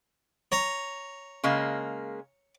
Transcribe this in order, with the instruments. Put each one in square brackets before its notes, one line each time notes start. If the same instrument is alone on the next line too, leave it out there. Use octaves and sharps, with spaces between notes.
[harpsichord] C#5 A#5
[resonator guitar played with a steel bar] C#3 G#3 A#3